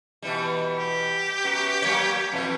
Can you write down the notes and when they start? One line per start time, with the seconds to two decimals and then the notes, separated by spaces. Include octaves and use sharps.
0.22 B2 E3 G3
0.79 G4
1.44 F#2 B3 F#4
1.82 F#3 A#3 C#5
2.32 F2 B2 E3